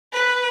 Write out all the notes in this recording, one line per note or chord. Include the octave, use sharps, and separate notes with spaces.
B4